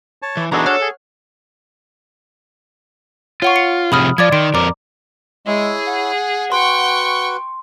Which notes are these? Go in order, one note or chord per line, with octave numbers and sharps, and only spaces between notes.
C#5 A5
E3
E3 B3 D4 D#4 F#4 G#4 A4 A#5
A4 C#5 F#5 F6
G#4
F4 C#5 F#5 C#6
C#7
C3 F3 G#4 B5 D#6 F6
F3 D5 D6 G#6
D#3 C6 D7
F2 A#4 A#5 D6
G#3 E4 G#4 C#5 E5
F#5
F#4 B4 G5 C6 C#6